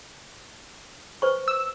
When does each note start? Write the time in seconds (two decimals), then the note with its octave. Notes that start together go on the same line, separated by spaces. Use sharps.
1.22 B4 C5 C#6
1.48 E6